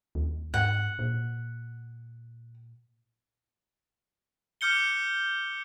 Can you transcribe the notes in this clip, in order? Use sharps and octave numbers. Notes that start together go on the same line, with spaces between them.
D#2
G#2 F#5
A#2
D6 F6 G6 C#7 G7